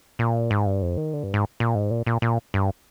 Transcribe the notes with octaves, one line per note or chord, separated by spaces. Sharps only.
A#2
G#2
G2
F2
D#3
D3
G2
G#2
A#2
G#2
A#2
A#2
A#2
G2